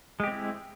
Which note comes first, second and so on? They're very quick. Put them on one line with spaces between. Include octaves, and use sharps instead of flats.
G#3 G4 C4 E4